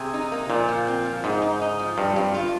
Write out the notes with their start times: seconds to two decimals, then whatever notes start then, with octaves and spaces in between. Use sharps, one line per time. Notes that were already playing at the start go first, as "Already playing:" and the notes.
Already playing: C3 G#4
0.14 D#4
0.32 A#3
0.49 A#2 F3
0.69 F3
0.87 C4
1.05 F3
1.24 G#2 D#4
1.42 D#4
1.61 D#4
1.79 F3
1.97 G2 F4
2.16 G2 C4
2.34 F4